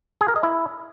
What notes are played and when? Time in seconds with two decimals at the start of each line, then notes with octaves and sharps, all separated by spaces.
0.21 G#4
0.28 A#4
0.36 D#5
0.43 E4